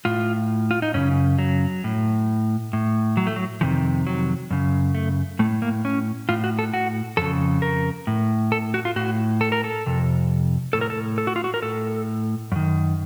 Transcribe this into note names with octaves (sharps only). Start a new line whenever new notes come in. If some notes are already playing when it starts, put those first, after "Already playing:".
A2 F4
F4
D#4
F#2 C#3 C#4
F#3
A2
A2
F#3
A3
F#3
F2 C3 D#3 F3
F#3
F#2 C#3
A3
A2 A3
A#3
C#4
A2 F4
F#4
A4
F#4
F2 C#3 A4
A#4
A2
A4
F#4
F4
A2 F#4
A4
A#4
A4
F2 C3
A2 A4
A#4
A4
A4
F#4
F4
F#4
A#4
A2 A4
F#2 D#3